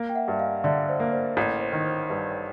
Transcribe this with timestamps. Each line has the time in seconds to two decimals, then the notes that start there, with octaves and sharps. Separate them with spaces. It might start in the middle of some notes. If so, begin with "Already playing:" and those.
Already playing: A#3
0.09 G5
0.15 E5 F#5
0.28 G2 E5
0.39 D#5 F5
0.64 D3 D5 E5
0.88 C5 D5
1.00 A#3
1.12 C5 D5
1.37 A1 C#5
1.61 C5
1.73 D#3
1.85 C5
2.05 C5
2.10 G2 B4
2.28 C#5